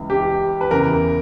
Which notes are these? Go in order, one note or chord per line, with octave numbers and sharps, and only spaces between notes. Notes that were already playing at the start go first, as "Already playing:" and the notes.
Already playing: C#2 C#3 E3
G4
B4
E2 C#3 E3 A#4